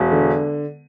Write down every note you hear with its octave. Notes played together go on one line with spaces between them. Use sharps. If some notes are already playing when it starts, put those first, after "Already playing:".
Already playing: E1
D3